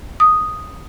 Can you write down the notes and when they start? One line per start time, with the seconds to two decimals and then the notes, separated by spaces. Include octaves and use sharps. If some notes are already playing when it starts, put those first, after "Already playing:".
0.20 D#6